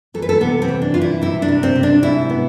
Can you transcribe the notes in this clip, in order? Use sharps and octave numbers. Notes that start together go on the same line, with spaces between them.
E3 A4
B4
A4
C3 B3
C4
E3
D4
C3 F4
E4
C3 E4
D4
C3
C4
C3
D4
G#2 E4
B3